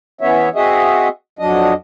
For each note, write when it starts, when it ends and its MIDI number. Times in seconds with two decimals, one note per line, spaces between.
0.21 0.49 52
0.21 0.49 59
0.21 0.49 61
0.21 0.49 73
0.21 0.49 76
0.55 1.08 60
0.55 1.08 66
0.55 1.08 68
0.55 1.08 75
0.55 1.08 76
1.39 1.74 41
1.39 1.74 54
1.39 1.74 62
1.39 1.74 75